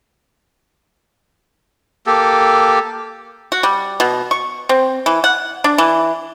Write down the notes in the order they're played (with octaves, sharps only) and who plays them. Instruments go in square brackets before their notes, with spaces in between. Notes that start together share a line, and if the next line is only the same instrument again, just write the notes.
[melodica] A#3 G4 A4
[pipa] F#4
G3
B2
C#6
C4
E3
F#5
D4
E3